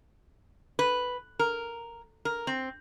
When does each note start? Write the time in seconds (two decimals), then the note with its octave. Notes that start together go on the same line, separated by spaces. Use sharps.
0.79 B4
1.39 A#4
2.25 A#4
2.47 C4